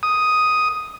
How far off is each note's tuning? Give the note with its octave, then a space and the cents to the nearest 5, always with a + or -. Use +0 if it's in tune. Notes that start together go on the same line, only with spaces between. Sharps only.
D#6 +5